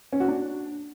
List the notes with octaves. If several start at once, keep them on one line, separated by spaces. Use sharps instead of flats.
C#4
F#4
D4